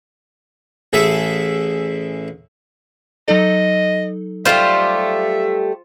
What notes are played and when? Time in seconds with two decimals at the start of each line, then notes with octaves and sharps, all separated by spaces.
0.93 A1 G#4 A4 E5
3.28 F#3 D#4 A4 D#5
4.45 G3 A3 F4 G4 C5 E5